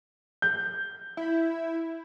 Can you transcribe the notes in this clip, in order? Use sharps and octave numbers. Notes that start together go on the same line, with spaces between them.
G6
E4